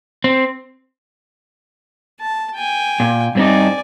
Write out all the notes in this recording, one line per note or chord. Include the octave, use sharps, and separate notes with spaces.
C4
A5
G5 G#5
A#2
G2 C4 D#4 D5 G#5